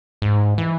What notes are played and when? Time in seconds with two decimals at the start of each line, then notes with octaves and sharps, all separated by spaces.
0.22 G#2
0.58 E3